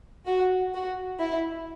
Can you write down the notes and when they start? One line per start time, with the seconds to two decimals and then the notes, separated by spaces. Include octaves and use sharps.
0.26 F#4
0.73 F#4
1.19 E4